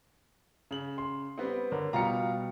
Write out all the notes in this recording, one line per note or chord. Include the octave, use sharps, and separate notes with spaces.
C#3 F#7
C6
G3 B3 C4
D3 A#4 C#5
B2 G3 F4 F5 A#5 C#7